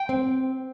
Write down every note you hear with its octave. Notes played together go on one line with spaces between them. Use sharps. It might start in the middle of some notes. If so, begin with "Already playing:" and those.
Already playing: G5
C4